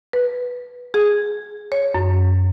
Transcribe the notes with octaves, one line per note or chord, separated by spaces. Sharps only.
B4
G#4
C#5
F#2